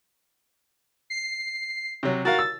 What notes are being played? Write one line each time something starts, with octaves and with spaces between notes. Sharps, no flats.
C7
C3 F#3
F#4 A#4 F5 A6
E6